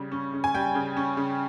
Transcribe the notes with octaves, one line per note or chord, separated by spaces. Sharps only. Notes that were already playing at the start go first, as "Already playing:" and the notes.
Already playing: C#3 G3
C#4
C#3
G#5
G3 G5
C#3
C#4
C#3